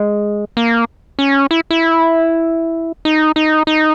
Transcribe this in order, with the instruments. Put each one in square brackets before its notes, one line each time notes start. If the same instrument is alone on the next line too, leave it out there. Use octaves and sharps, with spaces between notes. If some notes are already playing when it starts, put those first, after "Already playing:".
Already playing: [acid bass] G#3
A#3
C#4
E4
E4
D#4
D#4
D#4